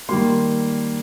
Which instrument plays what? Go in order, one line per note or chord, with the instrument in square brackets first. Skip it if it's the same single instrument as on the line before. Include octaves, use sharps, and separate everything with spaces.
[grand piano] D#3 G3 A#3 C6